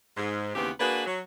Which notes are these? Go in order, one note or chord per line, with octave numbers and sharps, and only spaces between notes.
G#2
D#2 C#3 E3 B3 C4 G4
A#3 D4 F#4 G#4 B4
F#3